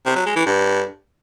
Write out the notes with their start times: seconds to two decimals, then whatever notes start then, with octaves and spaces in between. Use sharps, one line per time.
0.06 C3
0.16 F#3
0.26 G#3
0.36 E3
0.46 G2